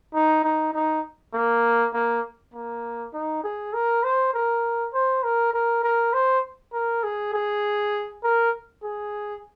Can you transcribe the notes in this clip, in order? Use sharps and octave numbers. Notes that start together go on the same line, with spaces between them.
D#4
D#4
D#4
A#3
A#3
A#3
D#4
G#4
A#4
C5
A#4
C5
A#4
A#4
A#4
C5
A#4
G#4
G#4
A#4
G#4